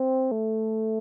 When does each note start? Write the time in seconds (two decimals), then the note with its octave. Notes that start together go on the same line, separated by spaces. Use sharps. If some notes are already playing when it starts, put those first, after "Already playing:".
Already playing: C4
0.31 A3